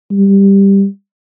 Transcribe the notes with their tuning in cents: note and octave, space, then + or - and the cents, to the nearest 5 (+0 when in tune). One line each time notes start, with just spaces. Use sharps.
G3 +10